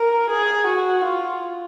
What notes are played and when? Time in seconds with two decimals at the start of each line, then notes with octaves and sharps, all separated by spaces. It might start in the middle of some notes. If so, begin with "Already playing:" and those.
Already playing: A#4
0.30 G#4
0.67 F#4
1.04 F4